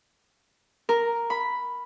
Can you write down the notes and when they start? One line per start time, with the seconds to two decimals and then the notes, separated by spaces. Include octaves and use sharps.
0.89 A#4
1.30 B5